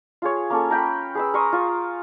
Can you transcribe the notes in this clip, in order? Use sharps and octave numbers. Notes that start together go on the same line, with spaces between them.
F4 G#4 C#5
A#3 C#4 A4
A#4 G5 B5
G#4 B4 E6
A#4 C6 C#6 D#6
F4 C#6